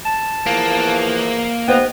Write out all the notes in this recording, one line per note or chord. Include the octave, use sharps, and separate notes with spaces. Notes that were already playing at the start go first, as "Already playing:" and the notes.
A5
E2 E3 F3 A#3
D#2 B3 B4 C5 D#5 G5